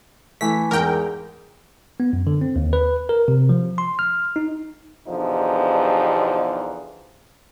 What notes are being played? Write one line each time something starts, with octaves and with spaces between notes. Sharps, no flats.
E3 A3 B6
E2 G#2 A#4 G5
B3
F#2
D3
C4
D#2
B4
A#4
C3
F3
C6
F6
D#4
E2 B2 D3 F3 D#4 G4